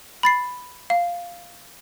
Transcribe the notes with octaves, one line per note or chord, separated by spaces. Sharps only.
B5 A6 C7
F5